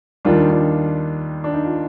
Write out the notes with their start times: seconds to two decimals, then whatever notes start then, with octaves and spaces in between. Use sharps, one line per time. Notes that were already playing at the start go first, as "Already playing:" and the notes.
0.25 D#2 D#3 G3 D4 F4
0.50 D4 F4
1.44 D4
1.54 D#4
1.64 F4